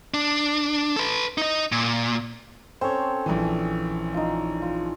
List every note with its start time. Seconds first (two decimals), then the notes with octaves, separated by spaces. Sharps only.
0.14 D4
0.96 A4 B4
1.38 D#4 D#5
1.72 A#2
2.81 C4 C#4 A4 C5 C#5
3.26 A#1 E3
4.14 D#4 F4
4.62 F4